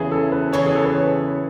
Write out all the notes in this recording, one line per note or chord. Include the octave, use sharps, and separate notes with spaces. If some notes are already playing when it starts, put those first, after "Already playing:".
Already playing: E2 C#3 E3 G#4
A4
B4
E2 C#3 E3 C#5
G#4
A4
B4
C#5